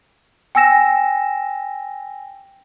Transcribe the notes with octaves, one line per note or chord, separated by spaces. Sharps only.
G5 G#5 E6 A#6 E7